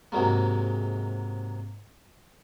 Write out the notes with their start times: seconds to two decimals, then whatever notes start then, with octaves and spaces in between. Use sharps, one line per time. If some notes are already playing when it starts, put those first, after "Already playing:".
0.12 G#2 C3 F#3 G#3 A#3